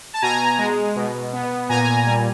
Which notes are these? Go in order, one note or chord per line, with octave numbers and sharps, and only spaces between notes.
A5
B2 G#5 A#5
G#3
B2
B3
A#2 G#5 A#5
G3